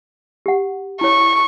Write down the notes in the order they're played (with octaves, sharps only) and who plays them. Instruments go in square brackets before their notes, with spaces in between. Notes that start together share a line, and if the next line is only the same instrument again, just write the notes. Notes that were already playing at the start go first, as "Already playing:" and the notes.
[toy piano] G4 F#5
[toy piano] E4 C#5 [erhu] C#6